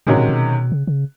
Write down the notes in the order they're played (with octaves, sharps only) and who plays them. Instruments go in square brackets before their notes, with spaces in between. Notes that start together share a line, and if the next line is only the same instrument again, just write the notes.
[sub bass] A2 [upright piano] C3 D#3 G#3 C#4 F#4
[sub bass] A#2
B2
C#3
C#3